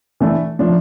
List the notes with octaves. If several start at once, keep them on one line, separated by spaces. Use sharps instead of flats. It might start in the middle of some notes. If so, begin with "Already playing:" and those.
E3 A3 D4
F3 A3 D4